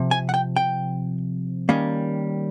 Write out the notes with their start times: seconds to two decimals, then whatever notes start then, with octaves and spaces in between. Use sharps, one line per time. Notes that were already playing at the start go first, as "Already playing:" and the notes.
Already playing: C3 F3
0.11 G#5
0.29 F#5
0.34 G5
0.56 G5
1.69 D#3 G3 A#3 C#4